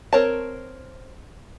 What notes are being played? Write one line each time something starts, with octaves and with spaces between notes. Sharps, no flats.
C4 A#4 C#5 A5